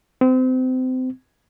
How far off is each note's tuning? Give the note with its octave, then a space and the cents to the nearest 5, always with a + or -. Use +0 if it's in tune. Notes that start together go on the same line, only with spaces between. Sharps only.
C4 -30